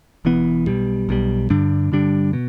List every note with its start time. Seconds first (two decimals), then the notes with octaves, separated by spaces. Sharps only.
0.25 E1 E2 E3 B3
0.67 B1 B2 G3
1.09 B1 B2 G3
1.50 G2 D3 G3 D4
1.92 G2 D3 G3 D4
2.33 B2